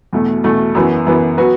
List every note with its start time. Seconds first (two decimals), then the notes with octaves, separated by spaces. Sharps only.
0.13 E2 B2 A3
0.44 E2 B2 A3
0.75 F#2 E3 B3
1.06 F#2 E3 B3
1.38 F#3 B3 F#4 B4